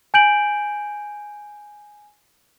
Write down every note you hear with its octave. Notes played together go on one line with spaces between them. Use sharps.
G#5 G6 D7 F#7